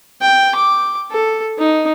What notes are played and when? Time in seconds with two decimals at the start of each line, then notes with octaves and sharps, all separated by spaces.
0.21 G5
0.55 D6
1.11 A4
1.58 D#4